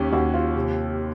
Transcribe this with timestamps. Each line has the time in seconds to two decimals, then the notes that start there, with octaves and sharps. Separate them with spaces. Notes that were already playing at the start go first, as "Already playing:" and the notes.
Already playing: D#2 C#4 G4
0.12 D#2 F#4
0.34 F4
0.56 C3